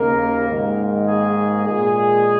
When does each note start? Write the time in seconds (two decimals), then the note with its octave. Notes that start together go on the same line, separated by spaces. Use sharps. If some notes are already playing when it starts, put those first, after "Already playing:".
Already playing: D#2 C#3 A#3 A#4
0.48 G#2 D#3 A#3
1.07 G#4
1.65 A#2 G#3 G#4